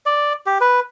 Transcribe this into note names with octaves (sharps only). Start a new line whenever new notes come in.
D5
G4
B4